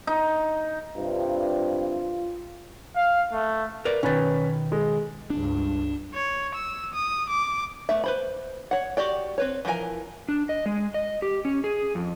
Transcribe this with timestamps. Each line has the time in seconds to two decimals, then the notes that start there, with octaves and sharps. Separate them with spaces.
0.07 D#4
0.97 G2 C3 F4
2.96 F5
3.33 A3
3.85 A#4 B4 D5 F7
4.03 B2 D#3 C#4 B4 A6
4.72 G#3
5.30 C#2 G2 D4
6.14 C#5
6.55 E6
6.94 D#6
7.29 D6
7.89 A3 B3 E5
8.04 B4 C5 B5
8.71 C#5 F#5
8.97 F#4 G4 D5 G5
9.38 C4 B4 C#5
9.65 E3 F3 G3 A#4 G#5
10.29 D4
10.49 D#5
10.66 G#3
10.94 D#5
11.22 G4
11.45 C#4
11.64 G#4
11.95 F2